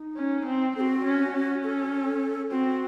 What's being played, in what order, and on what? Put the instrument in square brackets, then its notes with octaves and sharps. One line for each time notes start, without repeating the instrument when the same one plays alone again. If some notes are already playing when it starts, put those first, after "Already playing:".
Already playing: [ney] D#4
[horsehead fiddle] C#4
C4
[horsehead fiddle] C4 [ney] F#4 A4
[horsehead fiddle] C#4
C#4
[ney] A4
[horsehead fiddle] C4 [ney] F#4